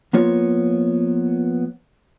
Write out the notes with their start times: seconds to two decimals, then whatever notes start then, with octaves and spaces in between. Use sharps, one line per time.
0.13 F3 A#3 B3 F4 C#5